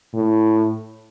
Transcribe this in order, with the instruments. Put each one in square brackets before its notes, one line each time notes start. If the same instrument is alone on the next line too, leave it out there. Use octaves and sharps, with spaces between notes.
[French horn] A2